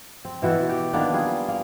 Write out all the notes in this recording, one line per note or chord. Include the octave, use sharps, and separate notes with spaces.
C4
B2 E3 F#4 A4
G4
D#3 A#3 B3 D4
G3 F4 G#4
A#3